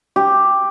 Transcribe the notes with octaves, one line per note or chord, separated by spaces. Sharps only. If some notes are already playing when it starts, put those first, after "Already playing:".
G4